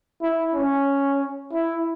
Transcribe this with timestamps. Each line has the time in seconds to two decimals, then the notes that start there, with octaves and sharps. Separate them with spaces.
0.22 E4
0.54 C#4
1.53 E4